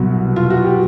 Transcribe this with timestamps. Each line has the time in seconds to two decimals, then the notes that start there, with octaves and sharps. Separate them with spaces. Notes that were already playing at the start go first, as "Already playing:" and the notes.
Already playing: C2 B2 F#3
0.36 F4
0.50 F#4
0.64 G4